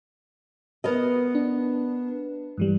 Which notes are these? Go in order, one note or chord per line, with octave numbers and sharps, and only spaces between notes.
B3 A#4 D#5
D4
G2 E3 G3